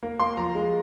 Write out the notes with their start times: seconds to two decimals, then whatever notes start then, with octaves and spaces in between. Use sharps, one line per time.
0.03 A#3
0.20 A#3 C6
0.37 F3 A#5
0.55 G#3